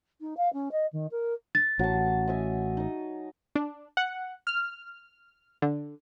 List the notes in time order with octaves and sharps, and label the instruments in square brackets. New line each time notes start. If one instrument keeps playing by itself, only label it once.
[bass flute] D#4
F5
C#4
D#5
D#3
A#4
[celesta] A6
[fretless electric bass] A1 [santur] F#3 A5
[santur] D#5 E5 G#5
D#4 D#5
[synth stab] D4
F#5
F6
D3